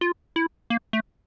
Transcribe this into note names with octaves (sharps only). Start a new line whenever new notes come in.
F4
E4
A#3
A3